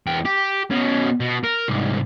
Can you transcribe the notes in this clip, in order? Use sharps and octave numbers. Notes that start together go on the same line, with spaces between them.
E2 G5
G4
B2 C#4
B2
A#4
C2 G#2